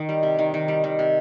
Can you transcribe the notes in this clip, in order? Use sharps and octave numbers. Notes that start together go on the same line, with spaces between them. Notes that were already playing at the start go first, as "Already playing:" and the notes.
Already playing: D#3
G3
C3
D#3
D#3
G3
D#3
C3